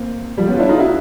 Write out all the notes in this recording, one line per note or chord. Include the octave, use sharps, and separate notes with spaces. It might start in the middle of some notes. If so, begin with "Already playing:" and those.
Already playing: A#3 C4
F3 G3
B3 C#4
F4
D4 E4
D#4 F4
E4 F#4